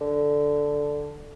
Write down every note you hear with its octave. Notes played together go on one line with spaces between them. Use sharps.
D3